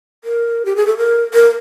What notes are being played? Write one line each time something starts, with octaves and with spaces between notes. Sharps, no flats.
A#4
G4
G#4
A4
A#4
A#4